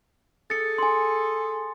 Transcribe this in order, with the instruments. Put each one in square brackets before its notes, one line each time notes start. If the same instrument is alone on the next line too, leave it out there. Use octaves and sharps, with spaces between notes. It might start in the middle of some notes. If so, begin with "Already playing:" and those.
[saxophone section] G#4 A4 [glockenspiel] A6 C#7
[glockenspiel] G#5 C6